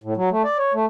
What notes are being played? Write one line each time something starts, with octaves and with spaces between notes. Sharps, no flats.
A2
F#3
A3
D5
C#5
A3